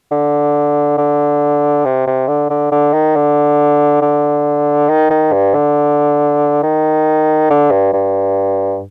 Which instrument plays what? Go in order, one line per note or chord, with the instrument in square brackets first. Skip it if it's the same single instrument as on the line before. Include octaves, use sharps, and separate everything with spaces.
[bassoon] D3
D3
C3
C3
D3
D3
D3
D#3
D3
D3
D#3
D#3
G2
D3
D#3
D3
G2
G2